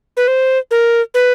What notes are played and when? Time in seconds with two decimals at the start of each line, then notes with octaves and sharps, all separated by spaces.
0.17 B4
0.28 C5
0.71 A#4
1.14 B4